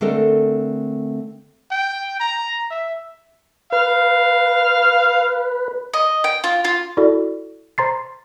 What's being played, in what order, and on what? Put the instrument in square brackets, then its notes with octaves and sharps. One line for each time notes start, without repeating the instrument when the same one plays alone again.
[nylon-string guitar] D3 A3 C4 A4 A#4
[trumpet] G5
A#5
E5
[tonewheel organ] B4 [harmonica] F5
[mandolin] D#5
G5
F4
F4
[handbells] E4 F#4 A4 D5
C5 A#5 C6 A6 C7